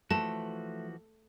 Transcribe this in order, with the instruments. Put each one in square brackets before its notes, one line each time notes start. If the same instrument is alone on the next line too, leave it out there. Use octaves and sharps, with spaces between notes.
[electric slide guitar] E3 F3 F#4 [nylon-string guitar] A3 [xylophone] A5